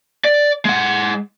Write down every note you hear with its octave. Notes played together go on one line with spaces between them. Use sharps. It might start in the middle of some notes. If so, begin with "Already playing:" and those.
D5
G#3 F#5